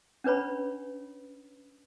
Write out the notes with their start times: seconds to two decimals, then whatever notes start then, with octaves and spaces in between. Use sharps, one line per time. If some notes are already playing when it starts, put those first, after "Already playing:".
0.24 C#4 D4 B4 C#5 B5